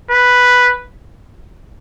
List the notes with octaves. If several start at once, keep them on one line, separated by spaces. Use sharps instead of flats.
B4